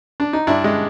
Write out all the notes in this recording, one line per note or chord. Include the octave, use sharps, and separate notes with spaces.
D4
D#4
G2 D4 E4
G#3